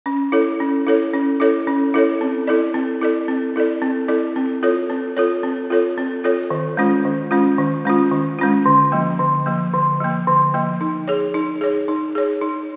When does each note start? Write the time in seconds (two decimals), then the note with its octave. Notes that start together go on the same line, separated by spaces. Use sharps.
0.06 C#4
0.32 E4 A4 C#5
0.60 C#4
0.87 E4 A4 C#5
1.14 C#4
1.40 E4 A4 C#5
1.67 C#4
1.94 E4 A4 C#5
2.21 C4
2.47 E4 A4 D5
2.74 C4
3.01 E4 A4 D5
3.28 C4
3.56 E4 A4 D5
3.82 C4
4.08 E4 A4 D5
4.36 C4
4.63 F4 A4 C#5
4.90 C4
5.17 F4 A4 C#5
5.43 C4
5.70 F4 A4 C#5
5.98 C4
6.24 F4 A4 C#5
6.51 D#3
6.77 G#3 C#4 F4
7.05 D#3
7.31 G#3 C#4 F4
7.58 D#3
7.85 G#3 C#4 F4
8.11 D#3
8.39 G#3 C#4 F4
8.66 D3
8.92 F3 A#3
9.19 D3
9.46 F3 A#3
9.74 D3
10.00 F3 A#3
10.28 D3
10.54 F3 A#3
10.81 D#4
11.08 G#4 C#5
11.34 D#4
11.61 G#4 C#5
11.88 D#4
12.15 G#4 C#5
12.42 D#4